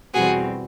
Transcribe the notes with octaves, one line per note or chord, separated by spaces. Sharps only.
E2 B2 G3 C4 F#4 G#4